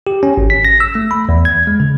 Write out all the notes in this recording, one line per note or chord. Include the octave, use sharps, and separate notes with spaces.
G4
C#4
G#1
B6
A#6
E6
A3
B5
E2
G#6
G#3
C#3